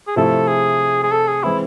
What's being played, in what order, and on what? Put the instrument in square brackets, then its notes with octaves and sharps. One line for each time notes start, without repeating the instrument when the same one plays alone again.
[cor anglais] G#4
[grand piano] C3 F3 A3 E4 [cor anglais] A4
[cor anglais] G#4
G#4
A4
G#4
[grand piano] E3 G#3 C4 [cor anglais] E4